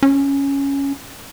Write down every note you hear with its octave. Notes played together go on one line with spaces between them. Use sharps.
C#4